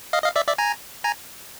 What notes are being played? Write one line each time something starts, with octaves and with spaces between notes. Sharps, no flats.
D#5 F5
D#5 F5
D5 E5
D5 E5
G#5 A#5
G#5 A#5